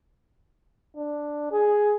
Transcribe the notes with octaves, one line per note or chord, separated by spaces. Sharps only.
D4
G#4